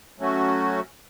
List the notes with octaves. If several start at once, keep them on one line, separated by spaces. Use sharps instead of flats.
F#3 A3 C#4 F#4